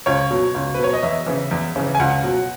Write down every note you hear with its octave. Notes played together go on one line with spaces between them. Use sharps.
C#2 C#5
B2 F#3
C#2
B4
B2 F#3 C#5
D#5
E2 E5
C#3 E3
E2
C#3 E3
G#5
C#2 F#5
B2 F#3